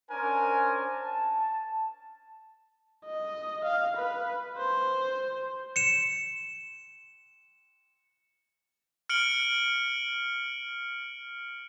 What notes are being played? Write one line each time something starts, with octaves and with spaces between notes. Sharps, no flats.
C#4 D4 A#4 C5 G#5
A5
D#5
F5
B4
C5
C#7 E7
F6 C#7 D7 F#7 G7